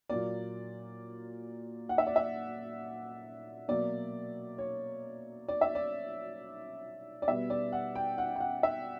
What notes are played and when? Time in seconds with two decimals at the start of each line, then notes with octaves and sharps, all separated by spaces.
0.09 A#2 F#3 A#3 D5
1.89 F#5
1.98 E5
2.07 D5
2.16 E5
3.68 B2 F#3 A#3 D5
4.58 C#5
5.48 D5
5.61 E5
5.75 D5
7.22 D5
7.28 B2 G3 B3 E5
7.50 D5
7.73 F#5
7.95 G5
8.18 F#5
8.36 G5
8.40 F#5
8.63 E5